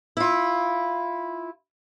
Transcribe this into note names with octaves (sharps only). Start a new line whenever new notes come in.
E4 F4